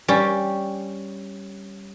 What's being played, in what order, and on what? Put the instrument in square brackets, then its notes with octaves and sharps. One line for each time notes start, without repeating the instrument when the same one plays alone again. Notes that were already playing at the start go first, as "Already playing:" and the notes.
[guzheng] G3 C#4 G4